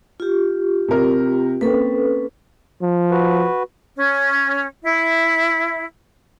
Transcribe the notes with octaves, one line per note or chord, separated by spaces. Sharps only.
F4 G4
C3 A#4
A#3 C4 C#4 A4 B4
F3
F#4 B4
C#4
E4